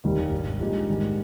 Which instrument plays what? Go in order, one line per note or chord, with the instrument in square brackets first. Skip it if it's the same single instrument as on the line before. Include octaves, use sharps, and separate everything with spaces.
[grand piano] F1 D#2 D#3 G3
G#1 G2 G3
A#1 A#2 G#3 D#4 G4
G#2 D#3 G3